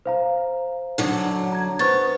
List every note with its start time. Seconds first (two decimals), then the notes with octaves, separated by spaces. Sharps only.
0.06 C5 F5 A#5
0.98 F#2 D3 F#3
1.52 A#5 G#6
1.79 B3 C5 C#6 A6